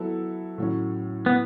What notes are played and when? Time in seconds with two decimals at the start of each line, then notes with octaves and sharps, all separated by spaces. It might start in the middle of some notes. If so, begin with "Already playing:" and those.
Already playing: F#3 B3 E4 A4
0.58 A2 F#3 C#4
1.26 B3